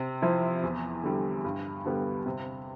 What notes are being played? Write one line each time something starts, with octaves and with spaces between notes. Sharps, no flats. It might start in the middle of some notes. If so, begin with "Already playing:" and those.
Already playing: C3
F3 C4 E4
E2
D3 G3
G2
D3 G3 B3
C3